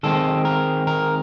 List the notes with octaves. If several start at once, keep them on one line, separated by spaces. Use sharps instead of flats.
D#3 G#3 C4 A4
A#4
A#4